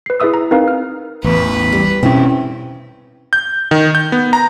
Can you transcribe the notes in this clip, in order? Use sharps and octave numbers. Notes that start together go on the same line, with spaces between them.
B4 C7
E4 G#4 B4 E5 D#6 E6
A#5
C4 D#4 A#4 B4 F5
F6
A1 E2 B4
G3
B2 C4 C#4 E4
G6
D#3
G6
B3
A#5